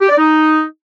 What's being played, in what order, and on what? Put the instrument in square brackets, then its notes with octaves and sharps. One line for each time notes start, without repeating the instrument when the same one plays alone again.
[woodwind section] G4
D5
D#4